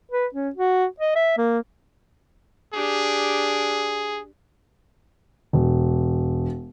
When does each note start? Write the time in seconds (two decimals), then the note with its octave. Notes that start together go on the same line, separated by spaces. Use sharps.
0.12 B4
0.35 C#4
0.55 F#4
1.00 D#5
1.16 E5
1.38 A#3
2.74 D4 G4 G#4
5.53 E1